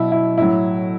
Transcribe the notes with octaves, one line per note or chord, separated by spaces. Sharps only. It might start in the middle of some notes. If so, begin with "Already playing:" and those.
Already playing: B2 F#3 E4
E4
A2 F#3 E4